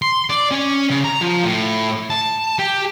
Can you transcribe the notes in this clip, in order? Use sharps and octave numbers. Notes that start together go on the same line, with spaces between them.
C6
D5
C#4
C#3
A#5
F3
A2
A5
G4